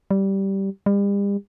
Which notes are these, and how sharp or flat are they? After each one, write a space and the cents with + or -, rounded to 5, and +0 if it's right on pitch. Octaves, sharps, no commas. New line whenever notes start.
G3 -10
G3 +40